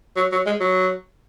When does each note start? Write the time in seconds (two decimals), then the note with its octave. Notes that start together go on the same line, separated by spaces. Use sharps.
0.16 F#3
0.32 F#3
0.46 G#3
0.61 F#3